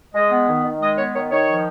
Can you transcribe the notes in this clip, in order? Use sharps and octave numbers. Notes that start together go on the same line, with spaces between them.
G#3 D#5
B3
D#3
D#3
G#3 D#5
B3 C#5
D#3 C#5
D#3 C#5
F3